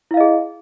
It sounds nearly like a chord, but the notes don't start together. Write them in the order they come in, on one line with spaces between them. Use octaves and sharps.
E4 F5 D#5 G#4